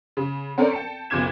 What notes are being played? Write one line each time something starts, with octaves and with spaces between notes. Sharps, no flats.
C#3
C4 C#4 A4 A#4 C#5 D5
G5 A5 C#7
F#1 B1 F4 D6 G#6 E7